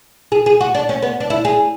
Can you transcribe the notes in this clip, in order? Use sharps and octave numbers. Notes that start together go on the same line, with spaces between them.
G#4
G#4
F#4
D4
C#4
B3
D4
E4
G#4